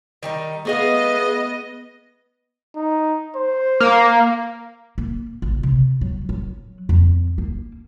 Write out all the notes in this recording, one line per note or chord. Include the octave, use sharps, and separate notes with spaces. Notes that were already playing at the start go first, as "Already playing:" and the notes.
D#3 G3 D#4
A3 B3 G#4 D#5 F5
D#4
C5
A#3
A#3
A1
C3
F#3
F#3
F2
A#3